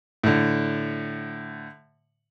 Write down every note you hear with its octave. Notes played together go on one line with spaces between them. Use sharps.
A2 D3